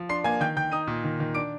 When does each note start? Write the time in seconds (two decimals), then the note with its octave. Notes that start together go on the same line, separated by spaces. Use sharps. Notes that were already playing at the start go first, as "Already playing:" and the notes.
Already playing: F3
0.09 D4 C6 C7
0.24 A#3 G#5 G#6
0.40 D#3 G5 G6
0.57 D#3 G5 G6
0.72 D#4 D#6 D#7
0.87 A#2
1.04 D#3
1.20 D#3
1.34 D4 D6 D7